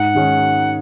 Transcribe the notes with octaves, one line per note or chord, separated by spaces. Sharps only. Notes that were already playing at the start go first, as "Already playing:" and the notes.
Already playing: G#2 F#5
D#3 G#3 C#4